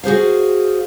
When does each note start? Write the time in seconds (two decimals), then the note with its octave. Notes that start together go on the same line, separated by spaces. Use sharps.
0.04 F#4 G#4 C5 F5